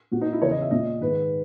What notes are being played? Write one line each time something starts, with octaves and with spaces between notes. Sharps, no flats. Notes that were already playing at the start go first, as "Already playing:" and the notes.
A#2 F#4
D#4
E4
E2 C#3 E3 C#5
D#5
E5
A#2 D#5
G#2 D#3 B4